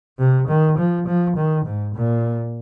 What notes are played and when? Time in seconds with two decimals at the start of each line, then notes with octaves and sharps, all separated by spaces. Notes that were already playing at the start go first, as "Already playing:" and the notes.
0.18 C3
0.48 D#3
0.78 F3
1.07 F3
1.37 D#3
1.65 G#2
1.95 A#2